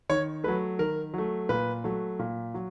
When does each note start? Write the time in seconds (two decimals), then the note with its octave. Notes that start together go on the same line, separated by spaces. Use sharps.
0.09 D#3 C#5
0.44 F#3 A3 B4
0.79 D#3 A#4
1.14 F#3 A3
1.49 A#2 B4
1.84 F#3 A3
2.19 A#2
2.54 F#3